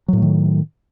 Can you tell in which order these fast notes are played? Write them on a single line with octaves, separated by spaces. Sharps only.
F#3 A2 A3 D#3